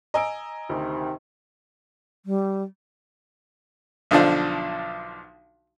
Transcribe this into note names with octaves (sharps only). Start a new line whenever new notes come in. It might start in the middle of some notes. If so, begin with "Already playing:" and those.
D#5 G#5 A#5 E6 D7
D2 C3 D#3
G3
B1 D3 F3 D4